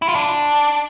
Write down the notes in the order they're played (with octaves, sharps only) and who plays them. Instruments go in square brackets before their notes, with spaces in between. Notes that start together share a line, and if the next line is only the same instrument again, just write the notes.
[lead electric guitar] E4
F4
D4